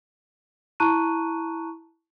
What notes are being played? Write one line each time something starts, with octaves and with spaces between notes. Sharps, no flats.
E4 A5 A#5 C#6 F#6 D#7